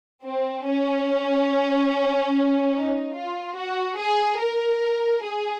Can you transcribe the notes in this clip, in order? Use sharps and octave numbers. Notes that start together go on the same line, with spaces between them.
C4
C#4
D#4
F4
F#4
G#4
A#4
G#4